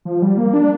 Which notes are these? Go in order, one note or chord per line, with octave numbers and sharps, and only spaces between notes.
F3
G3
A#3
D4